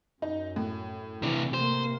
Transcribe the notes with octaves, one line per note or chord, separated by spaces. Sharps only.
F#2 D#4
A2
C3 E3 D4
C3 A#3 C5